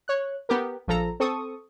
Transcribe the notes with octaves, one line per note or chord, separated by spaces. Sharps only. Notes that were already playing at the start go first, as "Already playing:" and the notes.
C#5 F#6
B3 G4 A#4
A#1 F3 A4 A#5
C4 A4 C#6 D#6